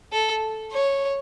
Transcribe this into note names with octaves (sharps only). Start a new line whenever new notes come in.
A4
C#5